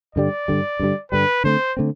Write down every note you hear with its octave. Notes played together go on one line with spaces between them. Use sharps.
G2 D3 G3 D5
G2 D3 G3
G2 D3 G3
G2 D3 G3 B4
D3 A3 C4 C5
D3 A3 C4